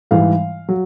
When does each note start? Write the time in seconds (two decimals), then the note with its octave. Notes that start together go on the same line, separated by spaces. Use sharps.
0.11 G#2 E3 G3 F5
0.69 F#3